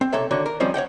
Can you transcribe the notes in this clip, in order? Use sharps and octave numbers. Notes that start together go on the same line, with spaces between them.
C4
B1 C3 A#3 A4 C#5 E5
D3 D#3 A#3 F#4 C#5
A#4
D#3 F3 G3 C4 C#4 D#4
C#5 D#5 F#5 G5